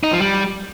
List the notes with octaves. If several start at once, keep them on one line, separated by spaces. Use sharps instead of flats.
D#4
F3
G3